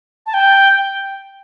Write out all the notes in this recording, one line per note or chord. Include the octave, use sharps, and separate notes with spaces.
A5
G5